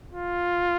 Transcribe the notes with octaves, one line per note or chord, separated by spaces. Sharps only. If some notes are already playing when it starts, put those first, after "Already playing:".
F4